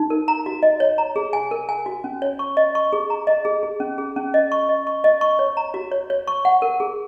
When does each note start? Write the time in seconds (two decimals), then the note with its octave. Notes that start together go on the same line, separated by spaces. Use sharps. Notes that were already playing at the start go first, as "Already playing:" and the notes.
Already playing: D#4
0.10 A#4
0.28 A#5
0.46 F#4
0.63 D#5
0.80 C#5
0.98 A#5
1.16 G#4
1.33 G#5
1.51 A#4
1.69 G#5
1.86 F#4
2.04 C#4
2.22 C#5
2.39 C#6
2.57 D#5
2.75 C#6
2.93 G#4
3.10 A#5
3.27 D#5
3.45 G#4
3.63 G#4
3.80 C#4
3.98 G#4
4.16 C#4
4.34 D#5
4.52 C#6
4.69 D#5
4.87 C#6
5.04 D#5
5.21 C#6
5.39 C#5
5.57 A#5
5.74 F#4
5.92 C#5
6.10 C#5
6.27 C#6
6.45 F#5
6.62 A#4
6.80 G#4